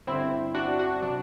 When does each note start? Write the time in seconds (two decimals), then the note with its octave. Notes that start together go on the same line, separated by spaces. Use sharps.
0.07 G1 G2 D3 C4 E4
0.54 D4 F#4
0.78 D4 F#4
1.02 C3 F#3 D4